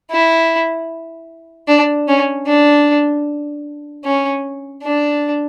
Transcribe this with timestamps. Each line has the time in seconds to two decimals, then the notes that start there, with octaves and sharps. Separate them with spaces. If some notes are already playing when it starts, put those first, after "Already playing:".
0.11 E4
1.68 D4
2.08 C#4
2.46 D4
4.04 C#4
4.83 D4